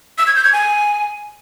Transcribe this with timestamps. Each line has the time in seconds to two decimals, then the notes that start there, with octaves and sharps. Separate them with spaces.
0.18 E6
0.27 G#6
0.35 G6
0.44 G#6
0.53 G#5